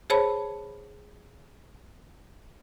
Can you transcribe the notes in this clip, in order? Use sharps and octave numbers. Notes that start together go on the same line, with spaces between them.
G#4 C5 C#5 A5 B5